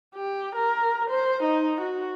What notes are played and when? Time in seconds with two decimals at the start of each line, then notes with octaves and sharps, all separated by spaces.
0.15 G4
0.55 A#4
1.10 C5
1.43 D#4
1.81 F#4